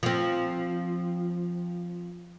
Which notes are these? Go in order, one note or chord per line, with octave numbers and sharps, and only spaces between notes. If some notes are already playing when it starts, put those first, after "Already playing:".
F3 C4